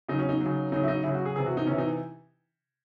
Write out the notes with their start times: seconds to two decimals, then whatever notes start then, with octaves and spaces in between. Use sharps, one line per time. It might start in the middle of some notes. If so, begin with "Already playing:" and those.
0.08 C#3 F#3 D#4
0.19 C#4
0.29 D#4
0.41 F#3
0.46 C#3
0.72 C#3 F#3 D#4
0.83 E4
0.88 D#4
1.03 C#3 F#3 E4
1.14 F#4
1.25 G#4
1.36 C3 E3 G#4
1.46 F#4
1.57 D#4
1.67 C3 E3 C#4
1.78 D#4